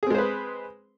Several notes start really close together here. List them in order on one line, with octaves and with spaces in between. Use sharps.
G#4 C4 G#3 C5 B4